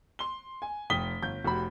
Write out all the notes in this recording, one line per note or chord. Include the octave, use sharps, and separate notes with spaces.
C6 G7
G#5
F1 G5 D#6 B6 G7
G1 G6
F1 F#4 G4 B5